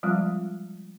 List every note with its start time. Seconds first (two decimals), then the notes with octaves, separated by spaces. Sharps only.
0.03 F3 G3 G#3 C4 F4